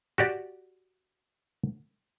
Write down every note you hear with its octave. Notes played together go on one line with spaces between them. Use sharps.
F#4 G4 D5